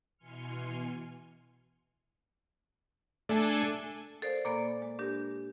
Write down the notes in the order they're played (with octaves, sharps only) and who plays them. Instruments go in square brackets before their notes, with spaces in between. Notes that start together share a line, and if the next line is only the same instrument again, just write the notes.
[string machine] B2 E3 G#5 C6 F6 C#7
[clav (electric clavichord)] A3 [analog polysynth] D4 A4 G#5
[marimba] A4 A#4 C5 D5 F5
A#2 A#3 A4 D5 G#5 B5
G#3
D4 G4 A#4